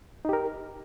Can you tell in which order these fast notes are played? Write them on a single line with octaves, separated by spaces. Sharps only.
D#4 G4 A#4